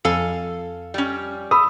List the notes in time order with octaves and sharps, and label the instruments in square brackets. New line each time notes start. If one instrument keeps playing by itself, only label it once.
[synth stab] F2 [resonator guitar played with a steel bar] A4 F5 G#5
[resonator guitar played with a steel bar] G3 C#4
[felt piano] B5 E6 [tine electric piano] D#6